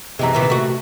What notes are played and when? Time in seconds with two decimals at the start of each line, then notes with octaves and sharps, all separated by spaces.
0.19 F#2 C3 E3 G#3 A#5
0.33 A#2 D#3 E3
0.50 A3 F#4